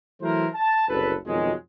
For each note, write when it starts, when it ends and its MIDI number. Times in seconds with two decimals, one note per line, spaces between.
0.22 0.47 52
0.22 0.47 54
0.22 0.47 57
0.22 0.47 64
0.22 0.47 70
0.22 0.47 72
0.55 0.89 81
0.89 1.14 30
0.89 1.14 36
0.89 1.14 69
0.89 1.14 71
1.27 1.52 41
1.27 1.52 47
1.27 1.52 51
1.27 1.52 54
1.27 1.52 56